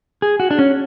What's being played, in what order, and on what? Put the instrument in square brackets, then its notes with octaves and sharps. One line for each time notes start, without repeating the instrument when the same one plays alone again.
[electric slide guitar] G#4
F#4
D4
C#4